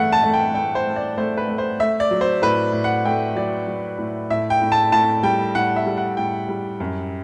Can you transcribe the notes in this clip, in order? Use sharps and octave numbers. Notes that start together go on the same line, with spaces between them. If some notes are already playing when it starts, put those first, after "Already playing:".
Already playing: G2 E3 A3 F#5
A5
A3
G5
A3 G5
C5
A3
D5
A3 C5
B4
A3
C5
A3 E5
D5
F#3
C5
A2 B4
A2
F#5
A3 G5
F#3 D5
F#3
A2
A2 E5
G5
A2
A5
A2 A5
G3 G5
A2 F#5
E5
G3
F#5
A2 G5
G3
F#2